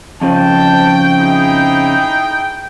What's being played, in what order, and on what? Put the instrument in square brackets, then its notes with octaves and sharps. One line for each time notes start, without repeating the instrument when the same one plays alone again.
[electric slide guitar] F2 C#3 F3 [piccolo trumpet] G5 [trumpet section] A5
[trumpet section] D#4 E4 G#4